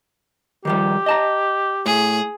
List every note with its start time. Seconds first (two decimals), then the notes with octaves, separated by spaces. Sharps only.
0.65 D#3 F3 G3 G4
1.06 D#5 A5 A#5
1.86 A2 G#4